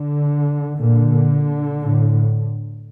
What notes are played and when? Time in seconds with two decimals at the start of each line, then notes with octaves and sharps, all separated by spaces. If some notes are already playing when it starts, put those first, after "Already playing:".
Already playing: D3
0.78 A#2 D3
1.81 A2